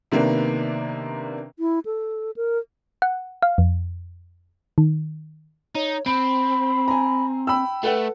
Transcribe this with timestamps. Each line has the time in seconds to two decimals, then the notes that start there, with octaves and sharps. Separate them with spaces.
0.12 C3 D#3 A#3 B3 D4
1.58 E4
1.85 A4
2.36 A#4
3.02 F#5
3.42 F5
3.58 F2
4.78 D#3
5.75 D#4 C#5
6.06 C4 B5 D7
6.88 G#5 A#5
7.47 G5 B5 E6
7.83 A3 A4 B4 F#5